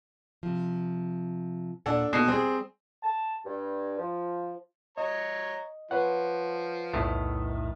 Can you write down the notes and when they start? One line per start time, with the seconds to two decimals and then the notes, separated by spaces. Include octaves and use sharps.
0.43 C3 F3
1.86 D#2 A#2 D4 A4 F#5
2.13 B2 A#3 D#4 A4 C7
2.28 G3 C4 G#4
3.03 A5
3.45 G2
3.98 F3
4.97 C#5 D#5 A#5
5.91 F3 B4 C#5 F#5
6.93 B1 E2 A2 D#3 A3